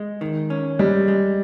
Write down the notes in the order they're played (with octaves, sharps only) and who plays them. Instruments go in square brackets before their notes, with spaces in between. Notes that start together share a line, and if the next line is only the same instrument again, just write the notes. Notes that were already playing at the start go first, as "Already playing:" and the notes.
Already playing: [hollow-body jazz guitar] G#3 G#4
D#3
C#4
[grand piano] G3 [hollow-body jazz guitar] G#3
[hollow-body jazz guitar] G#3